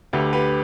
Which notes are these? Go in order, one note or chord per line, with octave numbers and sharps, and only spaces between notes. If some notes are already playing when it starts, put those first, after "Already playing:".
D2 D3 G4 B4
G4 B4